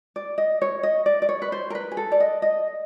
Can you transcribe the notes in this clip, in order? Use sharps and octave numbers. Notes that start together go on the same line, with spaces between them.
D5
D#5
C#5
D#5
D5
D5
C#5
B4
C5
A#4
B4
G#4
A4
D5
D#5
D#5